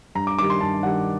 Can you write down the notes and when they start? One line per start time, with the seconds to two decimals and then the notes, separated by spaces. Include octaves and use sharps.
0.15 G2 A#5
0.27 D6
0.38 D#3 D6
0.42 G3
0.50 C6
0.61 G2 A5
0.83 D#3 G3 F#5